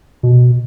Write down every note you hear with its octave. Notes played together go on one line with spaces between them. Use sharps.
B2